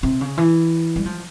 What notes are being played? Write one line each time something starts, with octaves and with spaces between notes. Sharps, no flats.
C3
C#3
E3
G3
F3